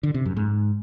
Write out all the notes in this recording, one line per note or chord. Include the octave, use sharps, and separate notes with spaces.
D3
C3
F#2
G#2